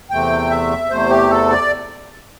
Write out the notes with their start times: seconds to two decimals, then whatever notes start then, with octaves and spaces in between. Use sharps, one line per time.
0.10 E2 C3 A3 G5
0.50 E5
0.90 E2 C3 A3 C5
1.10 G4
1.30 A4
1.51 D5